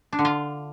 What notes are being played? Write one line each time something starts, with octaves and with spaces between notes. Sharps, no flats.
D4
D3
F4